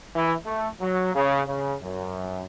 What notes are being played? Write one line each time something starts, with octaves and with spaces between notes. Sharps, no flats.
E3
A3
F#3
C#3
C#3
F#2